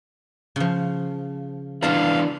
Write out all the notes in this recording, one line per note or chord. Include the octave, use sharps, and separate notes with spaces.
C#3 F3
E3 B3 D4 F4 F5 A5 A#5